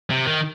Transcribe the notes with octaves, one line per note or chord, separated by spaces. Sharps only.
C3
D#3